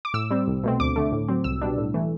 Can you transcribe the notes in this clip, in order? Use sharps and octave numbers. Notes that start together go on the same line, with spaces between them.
D6
A2 E6
G3 C4
C2
B2 A3 C4
D2 D6
D3 A3
A2
F#3 C4
C2 E6
B2 G3 D4
A2
E3 A3